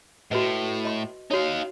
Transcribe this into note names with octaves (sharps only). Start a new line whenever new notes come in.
A2 F#4 B4 D#5
D#5 C6
D#4 F#4 C#5 F5